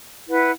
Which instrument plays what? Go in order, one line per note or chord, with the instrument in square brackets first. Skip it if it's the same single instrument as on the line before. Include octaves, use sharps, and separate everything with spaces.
[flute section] E4 B4 F#5